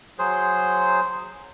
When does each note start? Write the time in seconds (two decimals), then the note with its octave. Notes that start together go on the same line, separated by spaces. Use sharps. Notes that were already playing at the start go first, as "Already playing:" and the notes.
0.19 F#3 G#4 C5